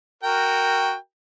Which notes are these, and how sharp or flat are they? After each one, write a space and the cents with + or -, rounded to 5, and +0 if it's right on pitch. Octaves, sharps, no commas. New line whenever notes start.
F#4 +0 A#4 -10 G5 +5